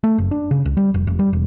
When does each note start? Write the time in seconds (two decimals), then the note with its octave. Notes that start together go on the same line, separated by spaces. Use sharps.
0.04 A3
0.18 F#1
0.31 D4
0.51 C#3
0.65 C#2
0.77 G3
0.94 F1
1.07 F1
1.19 G3
1.33 E1